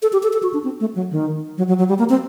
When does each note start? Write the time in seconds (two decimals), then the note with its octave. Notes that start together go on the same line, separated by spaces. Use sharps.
0.02 A4
0.13 G4
0.23 A4
0.33 A4
0.43 F#4
0.54 D4
0.64 C4
0.80 A3
0.95 F#3
1.11 D#3
1.58 F#3
1.68 F#3
1.79 F#3
1.89 G3
1.99 A#3
2.09 C4